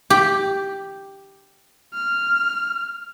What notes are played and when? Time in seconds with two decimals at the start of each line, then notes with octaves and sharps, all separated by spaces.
0.10 G4
1.94 F6